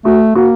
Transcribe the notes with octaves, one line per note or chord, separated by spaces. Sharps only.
A3 F#4
A#3 F#4